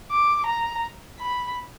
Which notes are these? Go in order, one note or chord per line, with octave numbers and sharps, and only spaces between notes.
D6
A#5
B5